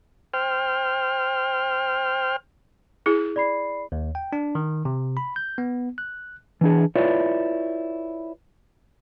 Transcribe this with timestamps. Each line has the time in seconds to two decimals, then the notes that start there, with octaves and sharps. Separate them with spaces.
0.34 C5 G5 F6
3.06 E4 G#4
3.36 D5 B5 C7
3.92 D#2
4.15 G5
4.33 D4
4.55 D#3
4.85 C3
5.17 B5
5.36 G6
5.58 B3
5.98 F#6
6.61 E3 D4 G#4
6.96 E4 F4 B4 C#5 D5